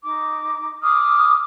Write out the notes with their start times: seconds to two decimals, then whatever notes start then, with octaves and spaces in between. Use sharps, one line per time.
0.03 D#4 D6
0.82 D6 D#6 F6